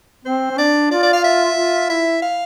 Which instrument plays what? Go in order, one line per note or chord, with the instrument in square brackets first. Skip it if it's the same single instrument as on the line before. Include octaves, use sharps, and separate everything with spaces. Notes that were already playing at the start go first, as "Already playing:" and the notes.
[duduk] C4 [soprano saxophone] C5
[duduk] C4
[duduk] D4 [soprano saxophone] D5
[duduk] F4 [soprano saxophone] D5
[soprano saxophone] D5
F5
E5
[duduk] F4
[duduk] E4 [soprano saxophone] E5
[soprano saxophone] F5